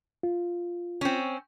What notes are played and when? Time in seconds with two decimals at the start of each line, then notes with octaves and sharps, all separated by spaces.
0.23 F4
1.01 C4 C#4